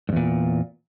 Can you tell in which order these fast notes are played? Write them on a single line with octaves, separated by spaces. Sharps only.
G2 E2 A#2